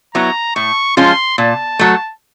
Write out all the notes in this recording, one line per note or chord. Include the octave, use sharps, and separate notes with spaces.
F#3 B3 E4 A#5
A2 C#6
F3 G#3 C#4 F4 C6
A#2 A5
F#3 A3